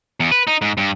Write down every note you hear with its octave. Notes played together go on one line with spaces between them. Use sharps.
E2
B4
D#4
G#2
G2